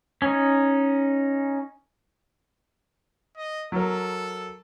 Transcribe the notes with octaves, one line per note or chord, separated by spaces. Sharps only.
C#4 D#4
D#5
F#3 A4 A#4